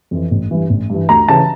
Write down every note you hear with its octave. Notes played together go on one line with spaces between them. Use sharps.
F2 E3
A1
G2 E3
A1
G2 E3
D2 A#5
C#3 E3 A5